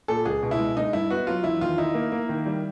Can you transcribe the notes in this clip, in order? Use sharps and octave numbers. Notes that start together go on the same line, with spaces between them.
A#2 A4
C#2 G#4
B2
E4
G#3
G#3 D#4
G2 E4
B3 F#4
F#3 F4
E2 E4
D#3 F4
D#4 E4
A#3
A#3
D#3
G3